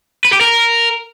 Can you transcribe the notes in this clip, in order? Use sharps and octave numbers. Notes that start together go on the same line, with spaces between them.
B4
G4
A#4